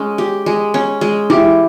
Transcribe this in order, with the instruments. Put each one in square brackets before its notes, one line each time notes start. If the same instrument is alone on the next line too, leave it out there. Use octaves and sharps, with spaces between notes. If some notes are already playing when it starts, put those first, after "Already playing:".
Already playing: [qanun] G#3 C#4
G4
G#3
C#4
G#3
[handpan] E4 [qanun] G4